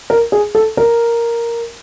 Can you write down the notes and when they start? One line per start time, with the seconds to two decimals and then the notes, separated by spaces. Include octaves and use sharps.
0.10 A#4
0.32 G#4
0.55 A4
0.77 A#4